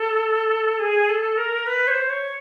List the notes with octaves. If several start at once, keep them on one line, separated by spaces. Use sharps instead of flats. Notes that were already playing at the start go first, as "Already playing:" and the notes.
Already playing: A4
G#4
A4
A#4
B4
C#5
C5
C#5